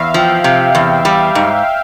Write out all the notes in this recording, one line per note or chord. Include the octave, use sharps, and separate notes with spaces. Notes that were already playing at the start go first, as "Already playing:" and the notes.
Already playing: E2 E5 F5
F3 G5
C3
E2
G3
G#2